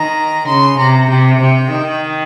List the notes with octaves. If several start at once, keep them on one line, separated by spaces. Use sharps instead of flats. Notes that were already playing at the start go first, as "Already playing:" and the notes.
Already playing: D#3 A#5
C#3 C6
C3 A#5
C3 G5
C3
D#3